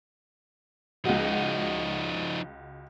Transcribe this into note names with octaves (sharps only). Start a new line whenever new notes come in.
C#2 F3 D#4 F#4